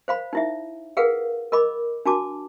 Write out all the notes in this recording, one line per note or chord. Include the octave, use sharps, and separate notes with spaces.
C5 F5 B5
D#4 E4 E5
G#4 A#4 B4 F5 F#5
A#4 D#5 B5 D6
D4 F#4 A5 D6